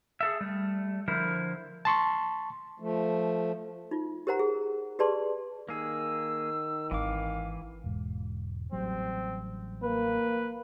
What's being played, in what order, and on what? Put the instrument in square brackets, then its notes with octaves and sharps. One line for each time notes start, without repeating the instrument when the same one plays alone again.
[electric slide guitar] G#4 A4 E5
G3 A3
D3 F3 E4 A#4 C5
[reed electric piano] A5 C6 C#6
[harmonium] F3 A3
[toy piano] D#4 F4
G4 A#4 C5 F#5 A#5
G#4
G4 G#4 B4 D5 A5 C6
[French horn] D#3 [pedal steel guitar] A#3 G#4 [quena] E6
[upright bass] G#1 [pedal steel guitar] E3 D6 [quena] F5
[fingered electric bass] E1 G#2
[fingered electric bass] A1 F#3 G3 [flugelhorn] C4
[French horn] A#3 [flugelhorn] B4